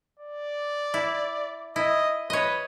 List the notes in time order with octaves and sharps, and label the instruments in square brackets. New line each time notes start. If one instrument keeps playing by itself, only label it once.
[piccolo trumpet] D5
[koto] E4
[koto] E4 [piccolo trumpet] D#5
[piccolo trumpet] B4 [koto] C#5 D#5